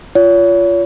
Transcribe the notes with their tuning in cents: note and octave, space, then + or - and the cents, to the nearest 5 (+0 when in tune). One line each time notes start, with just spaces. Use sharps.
F4 -15 C#5 +35